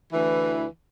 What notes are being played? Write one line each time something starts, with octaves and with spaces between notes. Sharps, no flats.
D2 E3